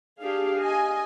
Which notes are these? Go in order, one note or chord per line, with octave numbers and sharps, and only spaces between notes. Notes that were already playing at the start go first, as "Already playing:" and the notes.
D4 G4 G#4 F5
D#5 G#5